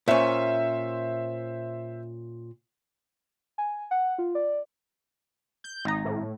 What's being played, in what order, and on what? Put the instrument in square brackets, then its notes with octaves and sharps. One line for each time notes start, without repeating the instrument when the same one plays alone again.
[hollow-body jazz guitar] A#2 C#4 [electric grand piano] C5 E5
[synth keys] G#5
F#5
F4
D5
[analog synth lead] G6
[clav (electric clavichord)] G#1 A#5 [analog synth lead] D#4
[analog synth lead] A2